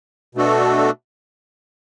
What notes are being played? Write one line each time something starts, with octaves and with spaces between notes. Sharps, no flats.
B2 A3 D4 F#4 A4